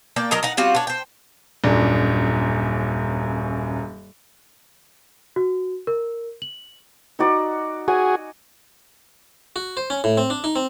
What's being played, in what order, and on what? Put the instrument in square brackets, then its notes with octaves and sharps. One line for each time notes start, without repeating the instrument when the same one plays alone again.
[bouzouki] A#3 D5 G5
F#3 A#4 D#5 A#5
D#4 A#4 F#5
G3 C4 F4 F#4
D4 C#5
C5 G5
[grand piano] D#1 F#2 D4
[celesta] F#4
A#4
F#7
[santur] D#4 F#4 D5
[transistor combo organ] F#4 G#4 [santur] F#5 G#5
[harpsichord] F#4
C5
C#4
A2
C4
D4
D#4
C4